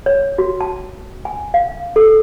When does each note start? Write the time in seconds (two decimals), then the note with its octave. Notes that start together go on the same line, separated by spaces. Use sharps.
0.06 C#5
0.38 F#4
0.61 A5
1.25 G#5
1.54 F5
1.96 A4